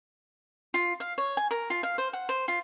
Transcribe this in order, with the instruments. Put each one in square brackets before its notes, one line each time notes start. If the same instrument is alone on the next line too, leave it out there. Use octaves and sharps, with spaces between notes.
[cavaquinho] F4
F5
C#5
G#5
A#4
F4
F5
C5
F#5
C5
F4